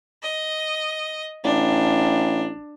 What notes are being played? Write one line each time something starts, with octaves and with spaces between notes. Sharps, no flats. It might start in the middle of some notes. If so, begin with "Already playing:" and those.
D#5
A1 D4